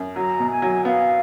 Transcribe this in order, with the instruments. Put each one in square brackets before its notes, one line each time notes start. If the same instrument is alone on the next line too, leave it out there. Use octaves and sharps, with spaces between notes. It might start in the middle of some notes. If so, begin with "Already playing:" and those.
Already playing: [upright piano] F#2
[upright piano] F#3 [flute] A#5
[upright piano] B2
[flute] G#5
[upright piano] F#3
[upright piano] B3 [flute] F5